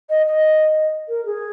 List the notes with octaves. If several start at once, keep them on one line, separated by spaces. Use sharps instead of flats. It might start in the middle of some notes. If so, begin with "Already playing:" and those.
D#5
D#5
A#4
G#4